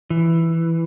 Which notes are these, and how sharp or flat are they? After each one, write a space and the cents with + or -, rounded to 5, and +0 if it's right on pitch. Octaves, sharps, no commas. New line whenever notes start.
E3 +5